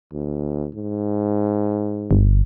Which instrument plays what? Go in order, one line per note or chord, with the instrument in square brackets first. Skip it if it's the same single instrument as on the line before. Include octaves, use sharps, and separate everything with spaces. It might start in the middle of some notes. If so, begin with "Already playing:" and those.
[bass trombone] D2
G#2
[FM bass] G1